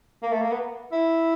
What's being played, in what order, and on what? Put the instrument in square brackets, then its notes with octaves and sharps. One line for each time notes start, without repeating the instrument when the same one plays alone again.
[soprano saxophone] A#3
A3
A#3
B3
E4